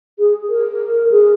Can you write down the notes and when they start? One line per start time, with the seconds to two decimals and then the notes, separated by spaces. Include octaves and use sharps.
0.19 G#4
0.49 A#4
1.11 G#4